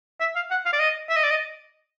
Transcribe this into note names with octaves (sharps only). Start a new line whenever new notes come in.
E5
F5
F#5
F5
D5
D#5
E5
D#5
D5
D#5